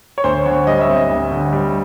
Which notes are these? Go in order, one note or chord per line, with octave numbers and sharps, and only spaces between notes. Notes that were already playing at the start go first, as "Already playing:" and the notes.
C#5
D2 C5
D3 C#5
G3 D#5
E5
C4
D#5
D2
D3
G3